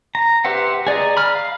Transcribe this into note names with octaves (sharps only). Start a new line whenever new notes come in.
A#5
G4 B4 C5 E5 F#5
G#4 D5 D#5 A#5
B5 F6
F5